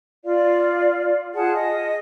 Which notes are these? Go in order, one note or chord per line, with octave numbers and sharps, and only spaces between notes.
F4 D5 F5
F4 G#4 F#5 A5
D#5